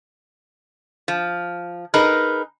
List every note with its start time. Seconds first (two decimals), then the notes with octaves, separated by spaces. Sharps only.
1.08 F3
1.94 D#4 G#4 A#4 B4